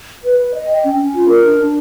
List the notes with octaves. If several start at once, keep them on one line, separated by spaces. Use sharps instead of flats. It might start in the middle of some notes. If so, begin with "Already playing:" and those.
B4
B4
D#5
G5
C#4
C#4
F4
A#4
D4
D4